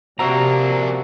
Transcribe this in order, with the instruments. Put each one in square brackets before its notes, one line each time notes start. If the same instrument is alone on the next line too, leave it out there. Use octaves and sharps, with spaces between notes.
[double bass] C3 [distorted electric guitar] A#3 D4 [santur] C4 F#4 E5 [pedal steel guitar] A#5